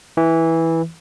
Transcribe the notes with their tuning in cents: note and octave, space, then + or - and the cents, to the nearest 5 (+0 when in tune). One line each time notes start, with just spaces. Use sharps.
E3 -10